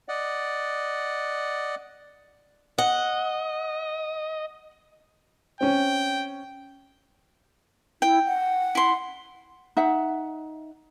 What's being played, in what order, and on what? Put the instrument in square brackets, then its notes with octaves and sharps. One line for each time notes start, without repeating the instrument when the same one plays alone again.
[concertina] D5 D#5 F#5
[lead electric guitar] D#5 [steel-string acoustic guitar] F#5
[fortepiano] C4 C#4 [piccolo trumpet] G5
[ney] E4 [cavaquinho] G5
[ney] F#5
[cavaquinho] E4 C6
[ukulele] D#4 E5 F#5